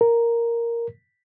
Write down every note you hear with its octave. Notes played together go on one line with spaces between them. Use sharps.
A#4